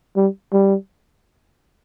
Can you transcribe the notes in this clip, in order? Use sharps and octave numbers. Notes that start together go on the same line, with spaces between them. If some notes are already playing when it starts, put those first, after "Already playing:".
G3
G3